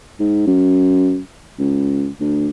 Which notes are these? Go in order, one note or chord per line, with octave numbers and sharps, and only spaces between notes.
G#2
F#2
C#2
D2